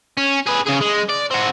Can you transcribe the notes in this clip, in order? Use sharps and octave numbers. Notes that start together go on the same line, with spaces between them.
C#4
G#4 B4
C#3 G#4
G#3
D5
C4 F#4